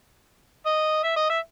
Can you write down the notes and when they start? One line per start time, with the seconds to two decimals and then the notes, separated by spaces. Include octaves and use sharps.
0.66 D#5
1.04 E5
1.16 D#5
1.30 E5